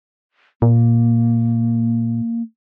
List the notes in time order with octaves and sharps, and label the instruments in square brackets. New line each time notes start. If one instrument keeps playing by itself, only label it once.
[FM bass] A#2 [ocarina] A#3